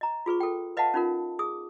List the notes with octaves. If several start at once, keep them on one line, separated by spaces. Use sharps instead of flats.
D#5 A#5
F4 G#4 B4 C#6
A4 G5
B4 D#5 F5 F#5 A5
C#4 D#4 F4 A#4
G#4 D#6